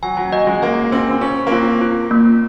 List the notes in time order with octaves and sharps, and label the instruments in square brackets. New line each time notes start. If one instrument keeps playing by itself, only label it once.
[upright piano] F#3 [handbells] G#5
[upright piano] F#3
[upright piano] F#3 [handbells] D#5
[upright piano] G#3
[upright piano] A#3 [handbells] G#5
[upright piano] C4 [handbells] C5
[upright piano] C4
[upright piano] C#4 [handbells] C5
[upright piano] A#3
[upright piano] C4 [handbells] F4
[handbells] F4
A#3